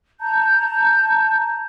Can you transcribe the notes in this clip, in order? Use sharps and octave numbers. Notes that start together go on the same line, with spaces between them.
A5 A#5 G6